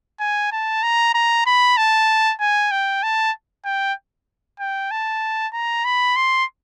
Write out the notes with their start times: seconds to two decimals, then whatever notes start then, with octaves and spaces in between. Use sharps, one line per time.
0.20 G#5
0.52 A5
0.83 A#5
1.14 A#5
1.46 B5
1.77 A5
2.40 G#5
2.71 G5
3.03 A5
3.65 G5
4.59 G5
4.91 A5
5.53 A#5
5.85 B5
6.16 C6